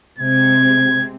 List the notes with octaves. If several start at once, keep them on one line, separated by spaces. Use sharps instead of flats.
C3 G#3 C4 G#6